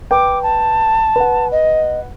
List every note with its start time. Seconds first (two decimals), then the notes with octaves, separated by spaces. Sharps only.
0.11 B4 G5 D6
0.42 A5
1.16 B4 F#5
1.51 D#5